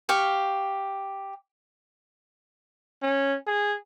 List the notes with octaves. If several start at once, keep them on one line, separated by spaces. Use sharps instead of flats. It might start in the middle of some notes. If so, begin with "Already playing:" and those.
G4 F5 C#6
C#4
G#4